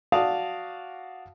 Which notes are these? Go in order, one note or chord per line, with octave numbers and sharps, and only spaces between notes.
F#4 D5 F5 A5 D#6